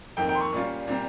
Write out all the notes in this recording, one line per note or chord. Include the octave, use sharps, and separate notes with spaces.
F2 D#3 A#3 G5
G5
C6
C#6
A#2 G3 C#4 F4
A#2 G3 C4